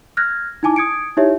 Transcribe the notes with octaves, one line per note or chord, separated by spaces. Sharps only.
F6 F#6 G#6 A#6
D#4 E4 G#5 A5 D6
D#6 G#6 C#7 D7
D#4 E4 G4 C#5 E5